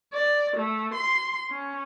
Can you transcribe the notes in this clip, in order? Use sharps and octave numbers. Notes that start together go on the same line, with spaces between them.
D5
A3
C6
C#4